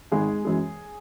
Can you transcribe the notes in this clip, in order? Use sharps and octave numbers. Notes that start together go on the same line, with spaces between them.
G#1 G#3 G#4
F#2 E3 G#3